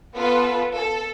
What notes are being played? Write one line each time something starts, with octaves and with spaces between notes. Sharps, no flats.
B3 F4 A4 B4
A4